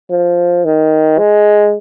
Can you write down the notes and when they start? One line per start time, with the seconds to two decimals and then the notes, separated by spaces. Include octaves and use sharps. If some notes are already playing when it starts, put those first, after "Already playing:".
0.10 F3
0.65 D#3
1.19 G#3